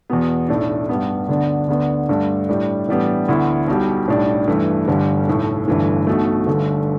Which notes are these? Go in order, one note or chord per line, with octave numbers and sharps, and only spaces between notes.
E2 B2 B3
B1 A2 A3 D4
G2 G3 B3
D2 D3 B3 D4
D2 D3 B3 D4
G2 D3 A3 D4
A2 G3 D4
A2 E3 G3 B3 D4
D2 D3 B3 E4
B1 B2 G3
B1 A2 G3 D4
G2 E3 A3
G1 G2 D3 G3
B1 A2 A3
G1 G2 E3 A3
B1 B2 A3
G1 G2 D3 A3